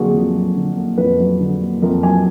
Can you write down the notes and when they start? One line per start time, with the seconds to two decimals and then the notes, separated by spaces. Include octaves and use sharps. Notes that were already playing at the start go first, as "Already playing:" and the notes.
Already playing: F2 D3 F#3 A#3 F#4 G#4
0.14 F2
0.35 F#3
0.56 D3
0.77 A#3
0.98 F2 B4
1.20 F#3
1.40 D3
1.61 A#3
1.82 F2 A#4
2.03 F#3 G#5